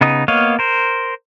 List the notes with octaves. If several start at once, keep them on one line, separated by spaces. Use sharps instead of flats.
C#3 B3 D#4 D#6
A#3 B3 C#5 D#5 F5
A#4 C5